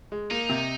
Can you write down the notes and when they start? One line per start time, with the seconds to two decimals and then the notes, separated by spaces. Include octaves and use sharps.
0.12 G#3
0.31 A#3 D#4
0.49 C3